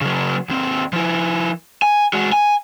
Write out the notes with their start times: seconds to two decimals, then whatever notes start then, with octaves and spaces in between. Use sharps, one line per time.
0.01 C#3 F#3
0.49 D#2 C4
0.93 F3 E4
1.82 G#5
2.13 G#3 F#4
2.32 G#5